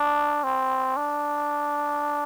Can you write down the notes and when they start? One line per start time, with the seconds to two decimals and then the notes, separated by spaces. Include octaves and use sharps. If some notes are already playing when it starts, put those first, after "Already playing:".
Already playing: D4
0.44 C4
0.97 D4